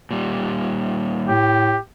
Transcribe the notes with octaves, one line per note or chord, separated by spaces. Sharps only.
A#2 G3
A2 G4